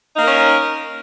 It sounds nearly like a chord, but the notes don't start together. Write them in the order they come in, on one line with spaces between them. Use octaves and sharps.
D#4 A#3 A#4 C#4